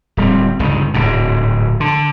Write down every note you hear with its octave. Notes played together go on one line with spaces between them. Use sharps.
D1 G3 C4
G1 C#2 D#3
D1 G#2 B2
D3